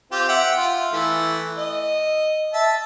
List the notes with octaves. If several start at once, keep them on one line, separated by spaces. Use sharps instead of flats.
C4 F4 G4
E5 F#5 G5
F4
E3 A3
D#5
E5 A5